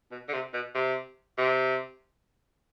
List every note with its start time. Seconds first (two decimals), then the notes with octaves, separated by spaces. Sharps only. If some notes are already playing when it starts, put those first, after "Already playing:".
0.12 B2
0.29 D3
0.33 C3
0.54 B2
0.75 C3
1.38 C3